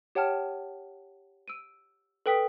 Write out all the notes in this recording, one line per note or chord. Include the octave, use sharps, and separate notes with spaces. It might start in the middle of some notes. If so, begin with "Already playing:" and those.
G4 C#5 F#5 G5 A5 F6
E6 D7 D#7
A4 B4 G5 D#6 B6